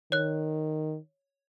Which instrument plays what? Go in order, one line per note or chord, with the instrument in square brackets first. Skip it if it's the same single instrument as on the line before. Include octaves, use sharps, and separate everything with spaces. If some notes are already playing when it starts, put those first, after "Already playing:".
[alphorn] D#3 [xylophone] C#5 F#6